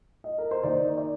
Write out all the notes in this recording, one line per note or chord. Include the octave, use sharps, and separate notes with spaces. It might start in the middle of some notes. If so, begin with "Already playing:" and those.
D#5
A#4
C5
D#3 A#3 D#4 D5
D5